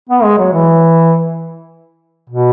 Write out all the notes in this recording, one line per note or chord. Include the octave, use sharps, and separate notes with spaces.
B3
G#3
F#3
E3
B2